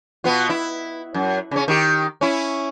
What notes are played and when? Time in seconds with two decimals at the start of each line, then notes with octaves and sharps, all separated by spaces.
0.24 B2 B3 F4
0.50 E4
1.14 F#2
1.51 C#3 C#4
1.68 D#3 G4
2.21 C#4 E4